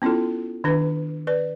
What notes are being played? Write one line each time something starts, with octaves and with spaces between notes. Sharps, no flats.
B3 C#4 E4 F4 A4
D#3 D4 B4
B4 D5